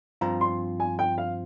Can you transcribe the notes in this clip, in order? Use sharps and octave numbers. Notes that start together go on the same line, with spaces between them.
G2 F3 C4 F4 A#5
C6
G#5
G5
F5